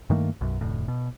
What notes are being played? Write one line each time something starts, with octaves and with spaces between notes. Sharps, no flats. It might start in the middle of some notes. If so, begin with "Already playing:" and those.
G2 D#3 A3 A#3
B1 F#2
F1 D2 A2
B2